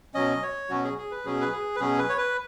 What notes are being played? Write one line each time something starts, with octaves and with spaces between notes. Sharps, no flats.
B2 F#3 C#4 D#5
C#5
B2 F#3 C#4 F#4
G#4
G#4
B4
B2 F#3 C#4 G#4
B4
G#4
B4
B2 F#3 C#4 G#4
B4
C#5
B4